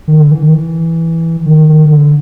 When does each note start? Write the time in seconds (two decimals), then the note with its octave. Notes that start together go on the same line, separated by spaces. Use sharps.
0.08 D#3
0.20 D3
0.31 E3
0.42 D#3
0.54 E3
1.46 D#3
1.69 D#3
1.86 D#3
1.92 D3